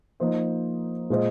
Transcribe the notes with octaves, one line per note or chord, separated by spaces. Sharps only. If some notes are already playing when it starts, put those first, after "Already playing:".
F3 A#3 D#4 C5 D#5
A#2 G#3 F4 C5 D#5